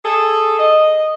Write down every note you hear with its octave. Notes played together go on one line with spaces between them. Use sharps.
G#4 A4
D#5